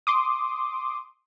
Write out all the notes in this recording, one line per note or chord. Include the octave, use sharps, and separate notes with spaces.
C6 D6 D#6